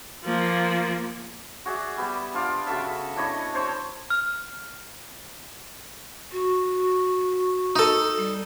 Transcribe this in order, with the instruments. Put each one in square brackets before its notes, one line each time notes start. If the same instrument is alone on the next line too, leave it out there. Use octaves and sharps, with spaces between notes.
[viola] F3 A#3
[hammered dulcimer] F#4 G#4 D5 E5
G3 B3 G4
D4 F4 D5
C#3 F#4 A4 E5
D4 E4 C#5 D#5
D4 C5 C#5
[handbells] F6
[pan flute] F#4
[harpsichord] D#4 A4
[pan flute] G3